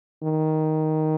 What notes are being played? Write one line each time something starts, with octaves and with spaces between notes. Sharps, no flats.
D#3